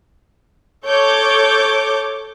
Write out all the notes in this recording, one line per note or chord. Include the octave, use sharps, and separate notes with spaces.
A4 C#5 D6 G6